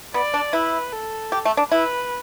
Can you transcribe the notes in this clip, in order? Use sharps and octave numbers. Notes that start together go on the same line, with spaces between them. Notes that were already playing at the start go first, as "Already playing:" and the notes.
B3 D5
D4
E4 B4
A4
G4
A3
D4
E4 B4